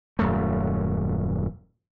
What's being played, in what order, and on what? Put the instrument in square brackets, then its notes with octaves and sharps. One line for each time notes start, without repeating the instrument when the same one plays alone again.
[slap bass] D#1 F#2 A3